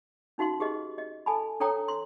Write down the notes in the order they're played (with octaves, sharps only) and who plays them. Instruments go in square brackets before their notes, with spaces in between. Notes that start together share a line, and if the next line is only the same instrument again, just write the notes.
[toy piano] C#4 D#4 F#4 F5 C6
G4 G#4 B4 D#5
D#5
A4 G#5 A5 B5
D4 A4 C#5 G5 A#5 D#6
C6